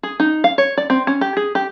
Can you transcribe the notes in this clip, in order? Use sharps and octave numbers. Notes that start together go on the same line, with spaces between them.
G#4
D#4
F5
C#5
D5
C4
C#4
G4
G#4
G4